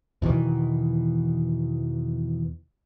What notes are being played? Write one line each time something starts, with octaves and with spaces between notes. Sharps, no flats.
E2 B2 D#3 E3